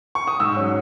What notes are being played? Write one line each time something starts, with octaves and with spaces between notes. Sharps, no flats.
C#6
D#6
G#2 E6
F#3 C#4